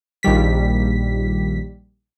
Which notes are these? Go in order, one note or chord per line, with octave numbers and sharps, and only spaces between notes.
A#1 D#3 G3 B6